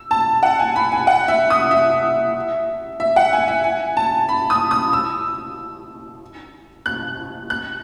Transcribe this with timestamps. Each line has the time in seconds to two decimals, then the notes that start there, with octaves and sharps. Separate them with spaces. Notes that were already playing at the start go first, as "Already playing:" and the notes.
Already playing: E6
0.11 A5
0.43 F#5
0.59 G#5
0.76 B5
0.92 G#5
1.07 F#5
1.28 E5
1.50 D#6
1.71 E5
3.00 E5
3.16 F#5
3.33 G#5
3.48 E5
3.64 G#5
3.97 A5
4.29 B5
4.50 D#6
4.71 D#6
4.93 E6
6.86 F#6
7.50 F#6